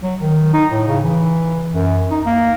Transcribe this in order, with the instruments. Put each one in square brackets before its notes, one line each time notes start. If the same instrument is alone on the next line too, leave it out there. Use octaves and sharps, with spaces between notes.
[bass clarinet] F#3
D#3
D#4
A2
C#3
E3
F#2
D#4
A#3